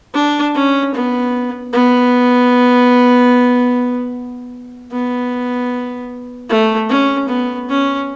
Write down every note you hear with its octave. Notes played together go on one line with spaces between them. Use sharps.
D4
C#4
B3
B3
B3
A3
C#4
B3
C#4